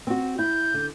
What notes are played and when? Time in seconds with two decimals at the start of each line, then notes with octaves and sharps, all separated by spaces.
0.07 C4 F#4
0.39 E4 G6
0.74 D3